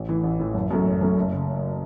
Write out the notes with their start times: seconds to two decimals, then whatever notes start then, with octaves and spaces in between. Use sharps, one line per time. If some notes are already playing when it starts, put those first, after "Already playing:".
Already playing: A1
0.09 A2 E3
0.23 A1
0.39 A2 E3
0.54 F#1
0.71 F#2 F#3 A3 C#4
0.86 F#1
1.01 F#2 F#3 A3 C#4
1.17 F#1
1.32 C#3